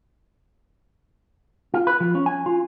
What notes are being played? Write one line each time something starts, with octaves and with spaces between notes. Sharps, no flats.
F4
B4
F3
C#4
G#5
F4